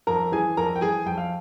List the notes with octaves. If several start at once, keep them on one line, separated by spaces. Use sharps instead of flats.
F2 A#4 A#5
E3 G#4 G#5
F2 A#4 A#5
G5
E3 G#4 G#5
F2 G5
F5